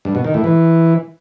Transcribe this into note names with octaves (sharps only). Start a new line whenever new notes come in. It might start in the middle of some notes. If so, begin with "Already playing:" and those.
G2
B2
D#3
A2
E3